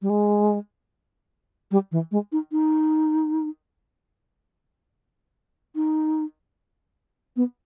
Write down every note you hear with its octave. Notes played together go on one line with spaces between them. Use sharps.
G3
G#3
G3
E3
G#3
D#4
D#4
D#4
B3